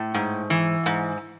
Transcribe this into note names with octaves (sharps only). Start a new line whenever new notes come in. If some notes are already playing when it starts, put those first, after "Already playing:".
Already playing: A2
G#2
E3
G#2